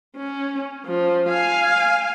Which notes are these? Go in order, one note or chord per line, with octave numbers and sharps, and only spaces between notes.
C#4
F3
F5 G#5